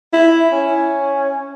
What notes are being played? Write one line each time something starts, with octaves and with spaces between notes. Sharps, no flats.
E4
C#4